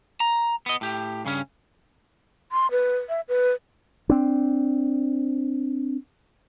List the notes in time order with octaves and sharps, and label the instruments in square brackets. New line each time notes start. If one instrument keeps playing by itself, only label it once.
[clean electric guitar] A#5
B3 D#5
A2 G4
G2 C#3 C#4
[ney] C6
B4
E5
B4
[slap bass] C4 D4